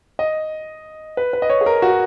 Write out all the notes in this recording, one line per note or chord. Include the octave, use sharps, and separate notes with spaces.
D#5
B4
B4
D#5
C#5
G#4
A#4
F#4